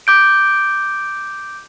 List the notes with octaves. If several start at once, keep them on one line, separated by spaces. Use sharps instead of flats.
D6 G6 D7